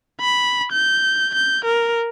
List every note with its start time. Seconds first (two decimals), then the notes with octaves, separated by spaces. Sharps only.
0.21 B5
0.72 G6
1.35 G6
1.65 A#4